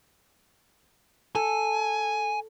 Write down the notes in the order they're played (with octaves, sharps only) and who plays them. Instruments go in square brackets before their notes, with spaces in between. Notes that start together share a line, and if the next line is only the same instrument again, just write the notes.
[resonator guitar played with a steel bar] A4 [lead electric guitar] G#5